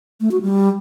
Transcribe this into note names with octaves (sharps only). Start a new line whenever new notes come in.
A3
F#4
G3